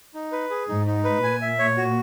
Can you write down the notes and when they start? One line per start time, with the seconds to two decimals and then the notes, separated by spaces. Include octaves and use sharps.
0.14 D#4
0.32 B4
0.50 G#4
0.69 G#2 D#4
0.87 D#4
1.04 B4
1.23 A#2 G#5
1.42 E5
1.59 C#5
1.77 F#4